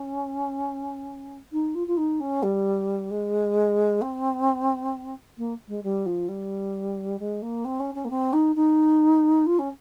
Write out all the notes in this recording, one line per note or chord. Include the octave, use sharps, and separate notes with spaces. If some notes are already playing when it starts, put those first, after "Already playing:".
Already playing: C#4
D#4
F4
F4
D#4
C#4
G3
G#3
C4
A#3
G#3
G3
F3
G3
G#3
A#3
C4
C#4
C#4
A#3
C4
D#4
D#4
F4
C#4